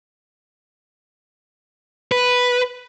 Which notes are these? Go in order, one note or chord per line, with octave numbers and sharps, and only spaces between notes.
B4